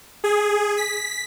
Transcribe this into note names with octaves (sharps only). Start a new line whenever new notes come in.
G#4
B6